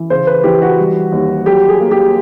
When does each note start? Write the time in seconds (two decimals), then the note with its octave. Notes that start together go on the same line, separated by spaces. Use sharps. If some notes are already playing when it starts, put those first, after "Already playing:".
Already playing: E3
0.10 C#3 C5
0.27 B4
0.44 E3 G4
0.62 F#4
0.79 G3
1.12 D#2
1.46 F#3 G4
1.69 G#4
1.80 A#3
1.91 G4